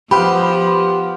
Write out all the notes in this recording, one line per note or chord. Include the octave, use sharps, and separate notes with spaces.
F3 B3 G4 B4 C5 F5 B5